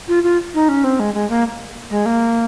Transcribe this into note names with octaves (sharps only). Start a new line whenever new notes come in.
F4
F4
D#4
C#4
C4
G#3
G#3
A#3
G#3
A#3